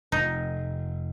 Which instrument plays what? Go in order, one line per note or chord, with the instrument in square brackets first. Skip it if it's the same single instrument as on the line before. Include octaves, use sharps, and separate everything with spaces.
[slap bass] F1 [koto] D#4